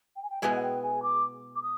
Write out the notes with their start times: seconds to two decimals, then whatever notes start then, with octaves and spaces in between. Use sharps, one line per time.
0.16 G5
0.23 G#5
0.30 G5
0.42 B2 G#3 B3 E4 G#4 G#5
0.56 F#5
0.62 G5
0.82 G#5
1.03 D6
1.55 D6
1.63 D#6